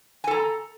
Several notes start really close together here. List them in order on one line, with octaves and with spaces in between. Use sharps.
G#5 A4 A#5